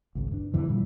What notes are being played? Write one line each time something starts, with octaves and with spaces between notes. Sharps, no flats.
G#1 C#2
G2 D4
E2 D3 E3 F3
G2 A#2 G3